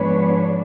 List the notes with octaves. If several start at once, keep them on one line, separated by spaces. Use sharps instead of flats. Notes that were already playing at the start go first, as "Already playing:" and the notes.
Already playing: G#2 F3 G#3 B3 D4 B4 C#5